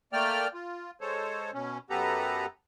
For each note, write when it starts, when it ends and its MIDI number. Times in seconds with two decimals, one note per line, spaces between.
0.13 0.48 57
0.13 0.48 58
0.13 0.48 74
0.13 0.48 79
0.13 0.48 89
0.54 0.91 65
1.01 1.51 56
1.01 1.51 69
1.01 1.51 72
1.01 1.51 73
1.54 1.78 47
1.54 1.78 61
1.90 2.46 42
1.90 2.46 59
1.90 2.46 67
1.90 2.46 69
1.90 2.46 71
1.90 2.46 82